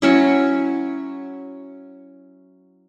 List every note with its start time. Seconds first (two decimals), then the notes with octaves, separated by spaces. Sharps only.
0.02 F#3 C#4 E4